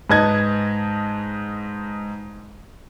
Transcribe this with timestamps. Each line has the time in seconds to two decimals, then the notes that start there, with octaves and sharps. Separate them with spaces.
0.10 G#2 B4 D#5 A5 G#6